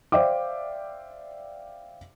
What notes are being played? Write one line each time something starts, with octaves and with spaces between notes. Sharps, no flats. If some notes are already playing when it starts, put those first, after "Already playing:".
C5 D5 E5 F5 G5 D6